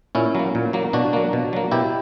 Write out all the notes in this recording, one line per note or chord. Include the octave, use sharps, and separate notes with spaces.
A#2 C#4 E4
F#3 A#3
A#2
F#3 A#3
B2 D4 F#4
F#3 A#3
B2
F#3 A#3
B2 E4 G4